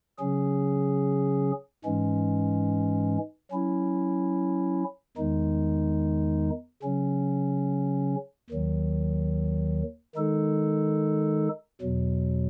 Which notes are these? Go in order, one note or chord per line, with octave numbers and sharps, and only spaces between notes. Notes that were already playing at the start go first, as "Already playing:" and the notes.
C#3 F#3 C#4 G#4
G#2 E3 G#3 C#4
F#3 C#4 E4
E2 D#3 G#3 D#4
C#3 F#3 C#4
D#2 D#3 F#3
D#3 G#3 D#4 A4
E2 B2 F#3